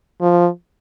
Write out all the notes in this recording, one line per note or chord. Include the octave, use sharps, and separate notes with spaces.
F3